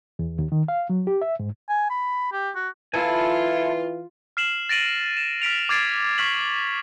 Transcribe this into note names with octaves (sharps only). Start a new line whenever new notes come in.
E2
D#2
D#3
F5
F#3
G4
E5
G#2
G#5
B5
G4
F#4
E3 E4 F4 A4 G#5
F6 C7 E7 F#7
A6 A#6 D7 D#7 F#7
E7
F6 B6 D7 F7
D6 F6 G#6 A6 C7 D7
C#6 F6 B6 F#7